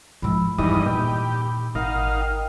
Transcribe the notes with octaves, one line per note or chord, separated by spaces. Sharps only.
G#2 F3 B5 E6
E2 G2 D#3 D#5
A#2 G4
G#1 D#4 A#4 F5 F#5
G5